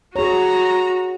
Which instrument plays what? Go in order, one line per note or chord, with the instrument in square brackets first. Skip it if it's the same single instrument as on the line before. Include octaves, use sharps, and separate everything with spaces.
[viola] F#4 [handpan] G#4 C#5 [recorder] A#5